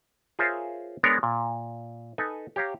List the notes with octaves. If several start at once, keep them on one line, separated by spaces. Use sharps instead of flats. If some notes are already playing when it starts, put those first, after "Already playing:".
F4 G#4 A#4 C5 C#5 E5
G#3 B3 D4 A#4 C#5
A#2
D#4 A4 B4 G#5
G4 C#5 F5 A#5